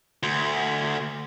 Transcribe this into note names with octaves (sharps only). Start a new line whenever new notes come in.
D2